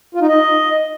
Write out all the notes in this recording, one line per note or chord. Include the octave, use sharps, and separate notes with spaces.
F4
D#4
D#5